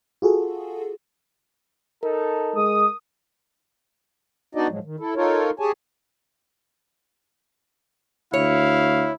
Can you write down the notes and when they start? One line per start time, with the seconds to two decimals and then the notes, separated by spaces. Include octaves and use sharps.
0.22 F4 F#4 G#4 A4
2.03 D#4 A4 A#4
2.55 G#3 D#6
4.55 B3 D4 D#4 F#4 D5 D#5
4.70 A2 F3 F#3 G#3
4.84 D#3
4.99 E4 A4
5.16 D#4 F4 A4 A#4 C#5
5.60 G4 G#4 C#5 G#5 A5
8.34 D2 E4 C#5 F5